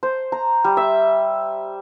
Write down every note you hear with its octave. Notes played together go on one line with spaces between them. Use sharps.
C5
A#5
G3
E5